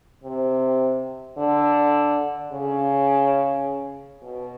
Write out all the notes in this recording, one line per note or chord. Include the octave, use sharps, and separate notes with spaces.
C3
D3
C#3
B2